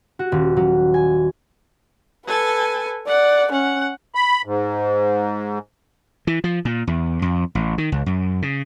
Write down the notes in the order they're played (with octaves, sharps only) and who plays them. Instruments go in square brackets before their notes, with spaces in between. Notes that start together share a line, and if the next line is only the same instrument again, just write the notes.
[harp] F#4
D#1
F#3
G#5
[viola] A4 G#5 [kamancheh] B4
[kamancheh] D5 [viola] F#5
[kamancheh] C#4 [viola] F#5
[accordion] B5
G#2
[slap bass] E3
F3
A#2
E2
F2
A1
D#3
C#2
F#2
C#3